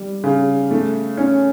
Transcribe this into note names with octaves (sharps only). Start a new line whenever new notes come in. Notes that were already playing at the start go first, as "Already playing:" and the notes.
Already playing: G3
C#3
A3
C#4